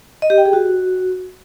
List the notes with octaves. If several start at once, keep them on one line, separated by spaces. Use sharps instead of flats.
D#5
G4
G5
G#4
F#4